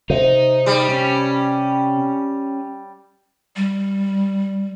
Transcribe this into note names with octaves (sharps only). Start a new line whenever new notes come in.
C3 D#4
G3
C#4
G3